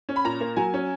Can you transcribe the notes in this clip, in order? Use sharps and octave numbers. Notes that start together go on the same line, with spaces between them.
C#4
B5
A#2 A#5
A#3
F#3 G#5
C#4